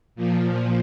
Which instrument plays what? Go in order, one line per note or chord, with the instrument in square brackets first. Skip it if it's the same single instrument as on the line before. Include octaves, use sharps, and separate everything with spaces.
[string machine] A#2 F3